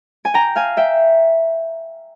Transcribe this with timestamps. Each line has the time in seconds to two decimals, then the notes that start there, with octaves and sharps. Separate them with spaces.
0.25 G#5
0.34 G5 A#5
0.56 F5 G#5
0.77 E5 G5